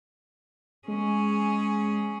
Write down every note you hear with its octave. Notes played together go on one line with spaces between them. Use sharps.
G#3 C#4 G#4